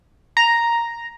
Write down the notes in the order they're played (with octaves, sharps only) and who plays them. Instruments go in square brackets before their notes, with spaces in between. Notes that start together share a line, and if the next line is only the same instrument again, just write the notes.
[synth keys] A#5